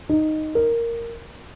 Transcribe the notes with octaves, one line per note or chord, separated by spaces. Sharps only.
D#4
A#4